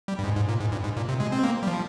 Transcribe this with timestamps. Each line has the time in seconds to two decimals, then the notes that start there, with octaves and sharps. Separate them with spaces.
0.08 G3
0.19 G2
0.24 G#2
0.36 G#2
0.49 A#2
0.60 G#2
0.72 G2
0.84 G#2
0.97 A#2
1.08 C3
1.20 G#3
1.32 C4
1.43 A#3
1.63 G3
1.67 F3